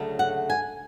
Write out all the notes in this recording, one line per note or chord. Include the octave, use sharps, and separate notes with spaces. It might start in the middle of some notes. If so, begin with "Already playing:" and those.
Already playing: D2 C#3 F#3 A3
F#5
G#5